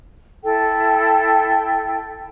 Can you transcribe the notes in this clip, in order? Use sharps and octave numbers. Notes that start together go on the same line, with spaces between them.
E4 A4 G5